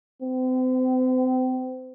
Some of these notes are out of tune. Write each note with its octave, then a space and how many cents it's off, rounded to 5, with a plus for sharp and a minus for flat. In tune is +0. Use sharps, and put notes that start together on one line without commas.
C4 -35